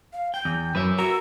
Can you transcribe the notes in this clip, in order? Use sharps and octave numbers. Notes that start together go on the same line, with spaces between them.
F5
G5 G6
E2
F#2 B4 E5
F#4 A#4 E6